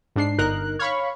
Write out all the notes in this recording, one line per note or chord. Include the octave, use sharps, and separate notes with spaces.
G#2 D4 C7
G1 D#4 A#4 F#6
C#5 F5 B5 C#6